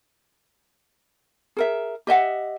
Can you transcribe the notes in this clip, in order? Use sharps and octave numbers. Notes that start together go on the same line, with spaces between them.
G#4 A#4 E5
G4 D#5 E5 F#5